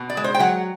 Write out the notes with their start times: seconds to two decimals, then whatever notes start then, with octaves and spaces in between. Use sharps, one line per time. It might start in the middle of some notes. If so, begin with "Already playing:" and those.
Already playing: B2
0.10 D5
0.17 G#3
0.24 C5
0.35 G5
0.40 F#3 F#5